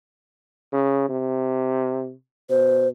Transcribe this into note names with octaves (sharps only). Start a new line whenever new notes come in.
C#3
C3
B2 C5